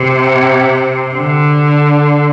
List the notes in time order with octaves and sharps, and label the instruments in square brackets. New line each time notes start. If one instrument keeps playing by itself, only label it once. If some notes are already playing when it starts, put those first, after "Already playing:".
Already playing: [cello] C3
D3